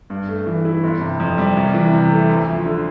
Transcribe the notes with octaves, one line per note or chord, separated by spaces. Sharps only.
G2
A3
E3
E4
G1
C3
F2
G3
C2
E3
C3
A3
D2
F3
D3